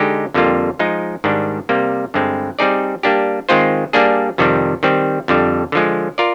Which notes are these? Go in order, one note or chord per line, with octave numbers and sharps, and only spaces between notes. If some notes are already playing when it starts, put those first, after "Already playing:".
Already playing: D3 G#3 D#4 G4
F2 D3 G3 A#3 F4
F3 G#3 D#4
G#2 D#3 G3 D4
C3 G3 A#3
G2 D3 G#3 C4
G3 C4 D#4 G#4 D5
G3 A#3 D4 G4
D#3 G#3 C4 F4 C5
G3 A#3 D4 G#4
F2 C3 D#3 G3
D#3 G3 C4
F2 D3 G3
D3 F3 G#3
F4 A#4 D5